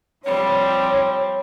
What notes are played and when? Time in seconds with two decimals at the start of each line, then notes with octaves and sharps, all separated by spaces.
0.25 F3 G3 C4 C#5